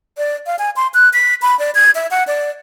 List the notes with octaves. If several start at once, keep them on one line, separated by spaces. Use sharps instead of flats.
D5
F5
G#5
C6
F#6
B6
B5
D5
G#6
E5
F#5
D5